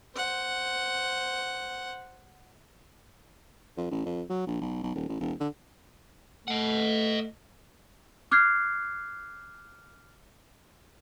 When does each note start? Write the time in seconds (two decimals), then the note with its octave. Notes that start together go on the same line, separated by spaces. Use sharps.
0.16 C5 F#5
3.77 F2
3.91 A1
4.05 F2
4.30 F#3
4.47 A#1
4.61 B1
4.83 B1
4.95 D#1
5.08 A1
5.20 E1
5.40 D3
6.48 A3 D#5 F#5
8.31 D6 F6 F#6 G#6 C7